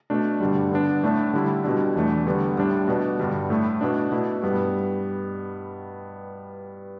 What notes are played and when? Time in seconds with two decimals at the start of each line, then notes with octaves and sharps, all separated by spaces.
0.10 B2 A3 D4
0.40 G2 D3 G3
0.72 D3 B3 D4
1.03 A2 A3 D4
1.33 D3 G3 E4
1.64 B2 G3 D4
1.96 E2 E3 A3 D4
2.27 D3 G3 B3
2.57 A2 G3 D4
2.88 B2 B3 D4
3.19 G2 D3 G3 D4
3.50 A2 A3 E4
3.81 B2 B3 D4
4.12 B2 A3 E4
4.42 G2 G3 B3